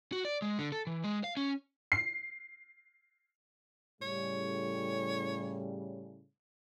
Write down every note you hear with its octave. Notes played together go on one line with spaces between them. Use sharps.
F#4
D5
G#3
D3
A4
E3
G#3
F5
C#4
C7
A2 C#3 G3 C#5